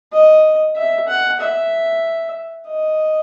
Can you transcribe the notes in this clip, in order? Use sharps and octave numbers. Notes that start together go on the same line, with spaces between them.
D#5
E5
F#5
E5
D#5